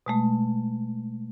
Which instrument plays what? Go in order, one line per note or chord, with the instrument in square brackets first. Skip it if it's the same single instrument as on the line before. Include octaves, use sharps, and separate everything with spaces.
[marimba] B2 G#3 A3